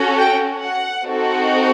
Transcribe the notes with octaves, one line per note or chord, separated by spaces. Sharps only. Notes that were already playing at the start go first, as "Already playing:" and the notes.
Already playing: C#4 F#4 A4
G5
F#5
C4 D#4 F#4 A4